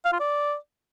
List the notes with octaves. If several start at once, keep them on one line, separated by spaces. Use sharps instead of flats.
F5
F4
D5